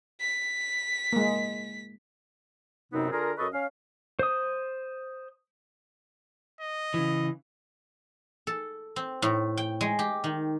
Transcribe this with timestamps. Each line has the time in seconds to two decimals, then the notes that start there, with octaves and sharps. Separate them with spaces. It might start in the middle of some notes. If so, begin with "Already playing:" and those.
0.21 B6
1.13 G#3 A#3
2.92 F#2 C3 B3 C4 D#4
3.11 D3 F4 G#4 A#4
3.37 F#2 A4 B4 D#5 C#6
3.53 C#4 F5
4.19 C5 D#6
6.61 D#5
6.94 C#3 E3
8.47 A4
8.96 C4
9.22 A2
9.57 G5
9.81 G#3
9.99 G4
10.24 D#3